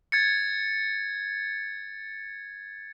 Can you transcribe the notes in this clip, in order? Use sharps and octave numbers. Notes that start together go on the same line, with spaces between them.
G#6 A6 C#7